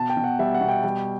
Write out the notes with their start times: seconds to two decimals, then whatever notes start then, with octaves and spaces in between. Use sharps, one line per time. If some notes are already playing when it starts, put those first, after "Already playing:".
Already playing: B2 A5
0.10 G5
0.17 B2
0.24 F#5
0.39 G3 E5
0.54 F#5
0.61 B2
0.68 G5
0.84 G3